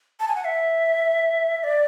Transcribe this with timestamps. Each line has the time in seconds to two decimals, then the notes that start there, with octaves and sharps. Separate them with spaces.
0.20 A5
0.28 G#5
0.36 F#5
0.45 E5
1.64 D5